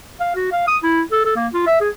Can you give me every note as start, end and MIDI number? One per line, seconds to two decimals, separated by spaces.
0.20 0.31 77
0.36 0.52 66
0.52 0.67 77
0.68 0.77 87
0.83 1.01 64
1.12 1.21 69
1.25 1.33 69
1.36 1.47 58
1.54 1.64 65
1.67 1.81 76
1.81 1.89 68